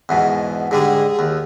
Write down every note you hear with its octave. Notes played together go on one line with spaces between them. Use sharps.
E2 G#2 B2
G#2 D3 G3 G#4
D#2